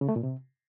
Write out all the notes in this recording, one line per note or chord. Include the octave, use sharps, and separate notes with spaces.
C#3
A3
A#2
C3